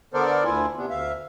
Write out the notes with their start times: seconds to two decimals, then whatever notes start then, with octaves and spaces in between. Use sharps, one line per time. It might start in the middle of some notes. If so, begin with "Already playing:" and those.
0.14 D3 B3 A4 A#4 C5 D5
0.45 D2 E4 F4 G#5
0.77 C3 B3 D4
0.90 D2 E5 F5